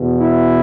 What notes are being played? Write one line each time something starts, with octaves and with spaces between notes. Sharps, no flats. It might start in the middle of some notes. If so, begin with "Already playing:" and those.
Already playing: E2 B2
E4